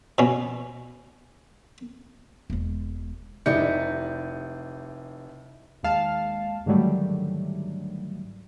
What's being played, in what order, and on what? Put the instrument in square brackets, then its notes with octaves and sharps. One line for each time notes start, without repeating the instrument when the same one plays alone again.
[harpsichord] B2 C#4
[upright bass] E1 G#3
[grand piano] F1 D5 C#7 [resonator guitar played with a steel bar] D#4 E4
[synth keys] D#2 G#3 F5 A5
G#2 D3 D#3 F#3 G3 A3